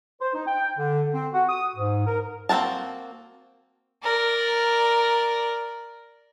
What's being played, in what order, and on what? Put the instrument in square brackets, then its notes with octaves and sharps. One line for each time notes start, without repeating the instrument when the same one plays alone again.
[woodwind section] C5
D#4
G5
D3
C4
F#4
D#6
G#2
A#4
[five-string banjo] A#3 C4 F#4 A#4 A5
[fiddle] A#4 D5